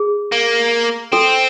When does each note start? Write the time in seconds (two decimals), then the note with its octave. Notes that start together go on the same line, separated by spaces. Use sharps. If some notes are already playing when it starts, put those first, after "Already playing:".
Already playing: G#4
0.32 A#3
1.13 C4 A4